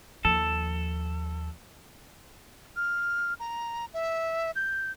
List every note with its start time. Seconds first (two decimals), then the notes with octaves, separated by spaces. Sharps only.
0.25 D#2 F3 A4
2.76 F6
3.40 A#5
3.94 E5
4.56 G6